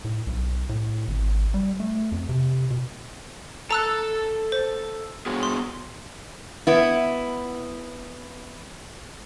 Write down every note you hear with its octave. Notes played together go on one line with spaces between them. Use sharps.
A2
B1
A2
G#1
G3
A3
F2
C3
B2
A4 A5 A#5 E6 F#6
C5
B3 F#4 G#4
C6
B3 E4